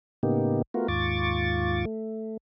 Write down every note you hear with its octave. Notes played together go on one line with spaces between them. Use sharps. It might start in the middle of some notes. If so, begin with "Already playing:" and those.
A2 C#3 A#3 B3 D#4 G4
A3 B3 F4 F#4 A#4
D#2 G#2 F4 C#6 D6 A6
A3